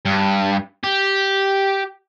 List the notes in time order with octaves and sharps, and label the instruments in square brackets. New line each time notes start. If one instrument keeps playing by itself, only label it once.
[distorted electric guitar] G2
G4